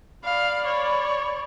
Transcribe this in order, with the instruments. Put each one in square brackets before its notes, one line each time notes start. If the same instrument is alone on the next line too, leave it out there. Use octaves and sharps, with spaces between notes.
[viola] D5 B5 [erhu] F5
[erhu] C#5